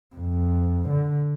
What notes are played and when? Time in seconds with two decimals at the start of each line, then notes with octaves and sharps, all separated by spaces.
0.16 F2
0.89 D3